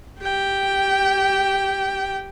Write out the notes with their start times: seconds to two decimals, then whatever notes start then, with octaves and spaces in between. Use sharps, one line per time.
0.21 G4 G5